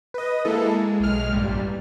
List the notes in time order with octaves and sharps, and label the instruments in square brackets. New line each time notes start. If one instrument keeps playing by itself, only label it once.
[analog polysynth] B4 D#5
G#3 A#3 E4 A4
G#3
B1 G#3 F6
A1 G2 A#2 G3